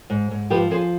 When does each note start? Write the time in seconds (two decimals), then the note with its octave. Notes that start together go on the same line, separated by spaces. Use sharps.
0.10 G#2
0.31 G#2
0.50 F3 G4 B4
0.71 F3 G#4 C5